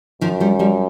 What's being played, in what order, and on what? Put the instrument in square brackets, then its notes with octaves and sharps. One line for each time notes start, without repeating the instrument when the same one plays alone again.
[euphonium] F#2 [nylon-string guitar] D#3 F3
[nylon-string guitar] F3 G3
F3 G3